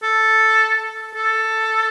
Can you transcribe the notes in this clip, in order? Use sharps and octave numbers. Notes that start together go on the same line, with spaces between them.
A4
A4